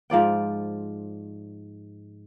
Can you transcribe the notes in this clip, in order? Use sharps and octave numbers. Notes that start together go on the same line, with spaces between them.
G#2 F3 D5 G5